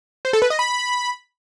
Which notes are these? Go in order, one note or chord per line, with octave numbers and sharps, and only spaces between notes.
C5
A4
B4
D#5
B5